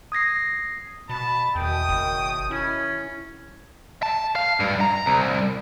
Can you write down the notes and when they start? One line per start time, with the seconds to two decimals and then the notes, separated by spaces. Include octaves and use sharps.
0.12 D#6 G#6 A#6 C7
1.09 B2 A5 B5
1.55 E2 B2 D#3 G5 D#6
1.89 F#1
2.51 C#4 E4
4.03 A5
4.36 F5
4.60 G2
4.81 A#5
5.06 C2